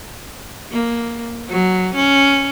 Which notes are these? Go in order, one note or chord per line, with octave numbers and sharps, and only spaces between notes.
A#3
F#3
C#4